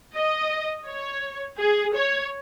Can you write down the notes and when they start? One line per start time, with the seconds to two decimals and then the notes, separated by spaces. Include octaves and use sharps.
0.14 D#5
0.86 C#5
1.59 G#4
1.95 C#5